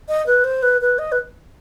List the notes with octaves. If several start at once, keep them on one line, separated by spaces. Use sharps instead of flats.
D#5
B4
C5
B4
B4
D#5
B4